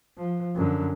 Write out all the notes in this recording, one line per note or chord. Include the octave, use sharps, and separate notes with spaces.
F3
F#2 D3